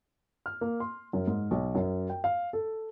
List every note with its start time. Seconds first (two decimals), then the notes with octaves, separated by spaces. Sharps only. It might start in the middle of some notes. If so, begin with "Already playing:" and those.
0.46 F6
0.61 A#3
0.80 C6
1.13 F#2
1.27 G#2
1.51 B1
1.75 F#2
2.09 G5
2.24 F5
2.53 A4